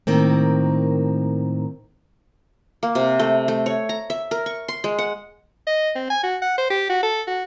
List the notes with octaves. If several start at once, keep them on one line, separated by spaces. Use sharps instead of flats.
A2 D#3 A#3 C4
A#3
C3
A3
A3
C#5
A#5
E5
A#4
C#6
C6
G#3
F#5
D#5
C4
G#5
F#4
F#5
C5
G4
F#4
A4
F#4